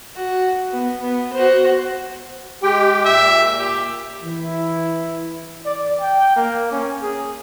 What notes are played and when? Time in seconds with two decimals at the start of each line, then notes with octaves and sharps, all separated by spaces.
0.16 F#4
0.71 B3
1.01 B3
1.33 F#4 C5
2.63 G#3 G4 G5
3.05 A#2 E5
3.59 G4
4.23 E3 E4
5.65 D5
6.00 G5
6.36 A#3
6.71 C#4
7.02 G#4